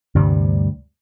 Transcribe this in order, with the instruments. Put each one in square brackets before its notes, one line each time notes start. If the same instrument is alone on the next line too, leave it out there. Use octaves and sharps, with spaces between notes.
[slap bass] D2 G2 C3 G3